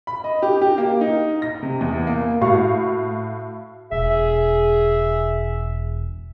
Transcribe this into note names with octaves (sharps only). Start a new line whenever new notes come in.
B5
D#5
G4
G4
A#3
D#4
A#6
C3
E2
A#3
A#3
A2 F#4 F5 C#6
E1 G#4 E5